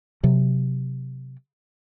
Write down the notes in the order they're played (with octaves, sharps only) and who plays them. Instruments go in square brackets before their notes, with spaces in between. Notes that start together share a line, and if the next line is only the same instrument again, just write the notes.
[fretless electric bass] C3 F#3